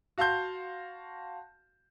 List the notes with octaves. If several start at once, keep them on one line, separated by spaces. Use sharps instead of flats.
F#4 F5 A5 C6 G6